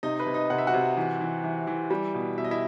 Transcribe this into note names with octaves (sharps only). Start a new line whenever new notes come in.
C3 D#4 D#5
B4
C3
D#4 D#5
C3 F#5
E5
F#4 F#5
C3
E3
E3
E3
E3
G3
B2
B2 E5
D#5
E4 E5